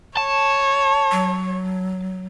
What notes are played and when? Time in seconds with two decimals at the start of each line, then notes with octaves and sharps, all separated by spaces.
0.17 C#5 A5
1.11 F#3